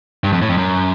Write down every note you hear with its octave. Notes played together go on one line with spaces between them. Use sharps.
G2
F2
A2
F2
F#2